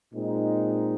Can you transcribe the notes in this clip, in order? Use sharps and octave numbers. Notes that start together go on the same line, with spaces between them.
A#2 G#3 C4 D#4